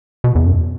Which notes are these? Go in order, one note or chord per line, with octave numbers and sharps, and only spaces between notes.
B2
E2
F#2